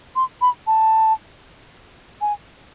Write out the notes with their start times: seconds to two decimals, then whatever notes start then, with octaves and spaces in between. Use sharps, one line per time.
0.16 C6
0.41 B5
0.67 A5
2.21 G#5